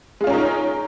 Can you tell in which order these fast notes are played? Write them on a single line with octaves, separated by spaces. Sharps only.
G#3 F4 C#4 A#4 D#4